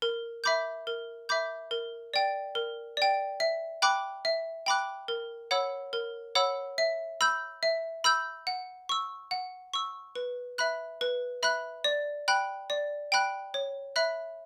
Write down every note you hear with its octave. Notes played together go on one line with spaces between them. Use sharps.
A#4
E5 B5 D6 G6
A#4
E5 B5 D6 G6
A#4
D5 G5
A#4
D5 G5
E5
G5 B5 D6 F#6
E5
G5 B5 D6 F#6
A#4
C#5 F#5 B5 E6
A#4
C#5 F#5 B5 E6
E5
B5 E6 G6
E5
B5 E6 G6
F#5
C#6 E6
F#5
C#6 E6
B4
E5 B5 F#6
B4
E5 B5 F#6
D5
G5 B5 F#6
D5
G5 B5 F#6
C#5
E5 B5 F#6